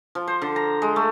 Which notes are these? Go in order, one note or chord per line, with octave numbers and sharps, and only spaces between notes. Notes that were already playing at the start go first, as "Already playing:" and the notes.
F3
C5
D3
A#5
G#3
A3